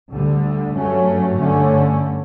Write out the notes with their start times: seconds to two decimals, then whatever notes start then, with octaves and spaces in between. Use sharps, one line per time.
0.11 D2 D3 G3
0.74 G2 F#3 A3 C#4
1.37 G2 D3 A3 C#4